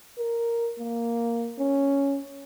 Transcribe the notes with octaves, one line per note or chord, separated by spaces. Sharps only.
A#4
A#3
C#4